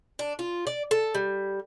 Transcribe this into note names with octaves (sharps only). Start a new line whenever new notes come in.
D4
F4
D5
A4
G3